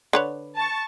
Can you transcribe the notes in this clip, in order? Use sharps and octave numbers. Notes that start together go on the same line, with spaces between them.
D3 B4 C#5
A5 C#6